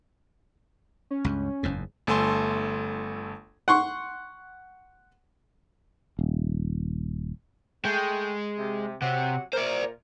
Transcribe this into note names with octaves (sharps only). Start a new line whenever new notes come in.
C#4
C#2 G2
F#1 E2 G#2
G1 A3 A4 G#5 A5 C6
F#5 C6 C#6
D#1
G#3 A3 G5
C3
C3 F#3 G4 F#5
A#2 A#4 C5 D5